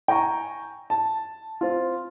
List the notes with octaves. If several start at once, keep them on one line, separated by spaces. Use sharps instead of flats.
G5 G#5 A#5 C#6
A5
C4 F4